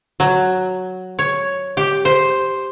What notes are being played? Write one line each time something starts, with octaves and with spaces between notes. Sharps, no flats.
F#3
C#5
G4
C5